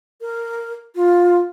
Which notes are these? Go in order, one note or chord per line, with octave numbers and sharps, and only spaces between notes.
A#4
F4